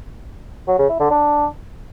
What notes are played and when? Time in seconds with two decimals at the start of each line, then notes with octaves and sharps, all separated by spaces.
0.68 F#3
0.79 C#3
0.89 E4
1.00 D3
1.10 D4